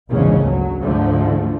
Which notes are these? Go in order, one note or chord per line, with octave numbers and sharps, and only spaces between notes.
A#1 E2 G#2 C#3 G#3 C#4
D2 F#3
D2 G#2 D3 F3 A3